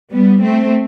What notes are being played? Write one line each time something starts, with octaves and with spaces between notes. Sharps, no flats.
G3 B3
A3 C4